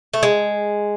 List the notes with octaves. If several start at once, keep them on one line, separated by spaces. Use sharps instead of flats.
A3
G#3